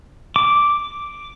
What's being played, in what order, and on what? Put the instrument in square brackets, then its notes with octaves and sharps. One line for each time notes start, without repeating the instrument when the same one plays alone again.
[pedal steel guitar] D6